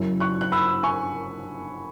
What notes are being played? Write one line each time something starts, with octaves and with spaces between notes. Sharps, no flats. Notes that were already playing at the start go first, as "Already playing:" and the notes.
Already playing: F#1 F#2 F#3 E4
C#6 F#6
F#6
B5 E6
G#5 C#6